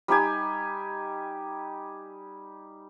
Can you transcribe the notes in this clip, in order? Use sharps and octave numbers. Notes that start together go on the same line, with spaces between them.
G3 D#4 G4 G#5